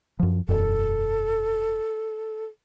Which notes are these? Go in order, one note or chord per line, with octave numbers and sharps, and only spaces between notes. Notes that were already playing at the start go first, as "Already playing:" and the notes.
F#2 F3
E1 F#2 A4